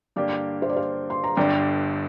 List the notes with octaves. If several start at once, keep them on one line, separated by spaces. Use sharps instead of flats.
G2 D3 A#3 G4 D5
C5
D5
C5 F5
C6
A#5
G1 G2 D3 D5 G5